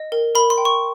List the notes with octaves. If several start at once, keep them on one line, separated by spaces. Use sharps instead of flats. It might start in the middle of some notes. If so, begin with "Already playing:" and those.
Already playing: D#5
A#4
A#4 B5
C6
G5
C#6